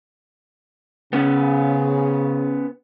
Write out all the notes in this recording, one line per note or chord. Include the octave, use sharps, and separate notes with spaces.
C#3 B3 C#4 F#5